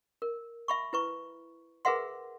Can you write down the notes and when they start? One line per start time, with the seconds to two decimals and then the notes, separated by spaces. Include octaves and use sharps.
0.22 A#4
0.68 E5 B5 C#6
0.93 E4 B4 C#6
1.85 G#4 A#4 B4 E5 F#5 C6